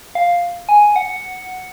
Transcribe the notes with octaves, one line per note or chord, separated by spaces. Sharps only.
F5
G#5
F#5